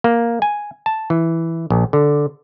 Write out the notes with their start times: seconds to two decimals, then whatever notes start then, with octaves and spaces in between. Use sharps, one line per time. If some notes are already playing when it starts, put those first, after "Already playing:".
0.04 A#3
0.42 G#5
0.86 A5
1.10 E3
1.70 A#1
1.93 D3